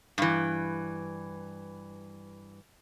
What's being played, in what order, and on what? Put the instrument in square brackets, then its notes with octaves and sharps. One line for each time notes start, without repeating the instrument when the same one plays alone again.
[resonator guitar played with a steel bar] G2 E3